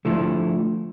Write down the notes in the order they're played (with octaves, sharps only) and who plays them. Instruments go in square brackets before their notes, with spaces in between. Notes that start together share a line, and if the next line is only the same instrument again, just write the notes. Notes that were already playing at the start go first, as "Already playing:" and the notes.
[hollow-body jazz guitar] D3 F3 A3 E4